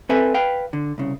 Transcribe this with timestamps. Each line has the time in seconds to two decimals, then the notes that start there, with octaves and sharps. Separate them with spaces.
0.09 C4 A4 B4 E5 G#5
0.34 B4 F5 G5
0.73 D3
0.98 C2 C#3